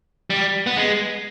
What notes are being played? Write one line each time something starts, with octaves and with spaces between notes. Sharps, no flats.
G3
B3
G#3